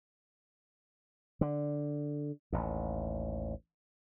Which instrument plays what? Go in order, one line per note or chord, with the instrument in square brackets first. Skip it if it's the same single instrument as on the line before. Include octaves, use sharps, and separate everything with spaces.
[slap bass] D3
A1 D#2